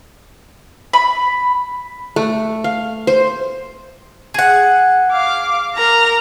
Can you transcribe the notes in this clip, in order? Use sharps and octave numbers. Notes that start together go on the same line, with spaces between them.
B5
A3
F5
C5
G#4 F#5
F5 D6
A#4 A#5